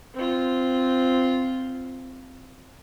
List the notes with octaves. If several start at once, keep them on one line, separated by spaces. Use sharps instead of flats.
C4 F4